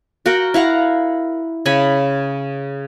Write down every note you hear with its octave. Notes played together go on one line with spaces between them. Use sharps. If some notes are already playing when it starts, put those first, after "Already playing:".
F#4 A#4 F#5 G5
E4 F5 F#5 A#5
C#3 C#5 G#5 B5